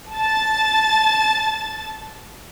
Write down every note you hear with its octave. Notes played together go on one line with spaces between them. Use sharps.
A5 A6